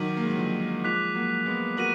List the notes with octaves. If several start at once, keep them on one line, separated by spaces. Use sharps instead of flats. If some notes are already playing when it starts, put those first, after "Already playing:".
Already playing: D#3 F#3 D6 F6 B6 D#7 F#7
A#3
G#3
F#3
D3 F3
F3 G#3 D6 F#6 B6 F7
F#3 A#3
G#3 B3
F#4 A#4 D#7 F#7